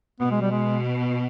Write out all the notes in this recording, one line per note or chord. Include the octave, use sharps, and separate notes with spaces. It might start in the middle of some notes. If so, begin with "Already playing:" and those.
B2 B3
G#3
G3
G#3